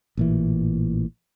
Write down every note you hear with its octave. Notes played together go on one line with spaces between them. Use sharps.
A1 A#2 E3